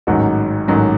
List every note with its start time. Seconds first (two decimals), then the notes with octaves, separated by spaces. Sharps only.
0.07 A1 G#2 D#3 F#3 F#4
0.68 A1 G#2 D#3 F#3